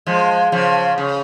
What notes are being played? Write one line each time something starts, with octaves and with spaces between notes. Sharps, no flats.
F3 G#3
C#3 F3
C#3